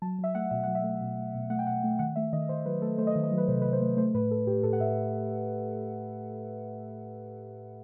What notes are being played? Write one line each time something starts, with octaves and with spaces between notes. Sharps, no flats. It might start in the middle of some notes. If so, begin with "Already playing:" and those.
F#3 A5
F#3 E5
A3 F#5
B2 E5
F#3 F#5
E5
A3
B2
A3
B2
A3 F#5
G5
B2 F#5
A3
D#3 F#5
A3 E5
D#3 D#5
D#3 C5
F#3 B4
A3 A4
A3 C5
D#5
D#3 C5
D#5
F#3
B4
C3 C5
C3 B4
C5
A3
A3 C5
A2 B4
A2 A4
A2 G4
A2 A4
F#5
A2 E5